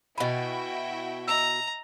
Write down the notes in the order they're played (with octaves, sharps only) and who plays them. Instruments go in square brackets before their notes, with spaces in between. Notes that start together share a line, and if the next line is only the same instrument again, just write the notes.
[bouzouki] B2 G#5 [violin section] E4 F#4 G5 [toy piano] D#5 B5
[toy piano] D#5 D#6 E6 [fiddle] A#5